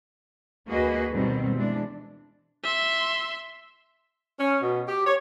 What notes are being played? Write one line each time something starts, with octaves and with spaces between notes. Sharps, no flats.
D2 A#3 F#4 G#4 B4 D#5
B2 D#3 G3 C4
E3 G#3 D4
E5 C6
C#4
B2
G4
C#5